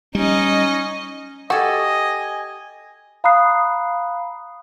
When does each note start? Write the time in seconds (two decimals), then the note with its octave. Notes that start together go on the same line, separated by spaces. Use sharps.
0.15 G3 C#4 D#4 D#5
1.50 F#4 G4 A4 D#5 G#5
3.24 F5 A#5 B5 D#6 F#6 C7